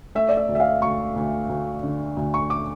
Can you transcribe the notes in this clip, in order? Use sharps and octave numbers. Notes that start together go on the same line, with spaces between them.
A3 E5
D5
E5
D2
E5
F5
D2 C#6
D2
D2
D3
D2
C#6
D6